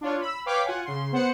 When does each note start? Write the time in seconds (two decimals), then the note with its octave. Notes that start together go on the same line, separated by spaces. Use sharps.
0.01 D4 F4 C#5
0.21 B5 E6
0.46 B4 C#5 F5 G5 D6 B6
0.65 F4 F#5 G#5
0.85 C#3 C6
1.12 B3 C5 F#5 C#7